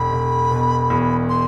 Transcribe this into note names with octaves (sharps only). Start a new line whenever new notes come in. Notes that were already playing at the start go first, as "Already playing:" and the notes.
Already playing: E1 B5
E1
B2
E2
C6